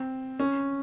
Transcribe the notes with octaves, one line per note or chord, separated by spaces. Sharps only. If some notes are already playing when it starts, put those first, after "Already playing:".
Already playing: C4
C#4